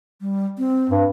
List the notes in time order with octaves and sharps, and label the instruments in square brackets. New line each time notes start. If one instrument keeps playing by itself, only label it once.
[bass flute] G3
C4
[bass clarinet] G2